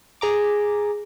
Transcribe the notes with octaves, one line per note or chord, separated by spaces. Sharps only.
G#4 A#5 D6